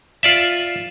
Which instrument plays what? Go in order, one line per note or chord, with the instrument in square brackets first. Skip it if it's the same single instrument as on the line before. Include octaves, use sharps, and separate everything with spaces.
[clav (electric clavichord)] F4 D5 E5